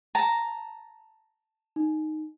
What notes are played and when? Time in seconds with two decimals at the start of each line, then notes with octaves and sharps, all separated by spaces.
0.15 A5 A#5
1.76 D#4